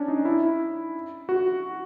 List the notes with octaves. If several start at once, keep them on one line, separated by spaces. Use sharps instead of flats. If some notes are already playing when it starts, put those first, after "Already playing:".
Already playing: C#4 D4
D#4
E4
F#4